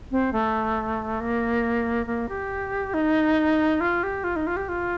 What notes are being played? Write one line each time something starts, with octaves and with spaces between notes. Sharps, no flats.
C4
A3
A#3
A#3
G4
D#4
F4
G4
F4
D#4
F4
G4
F4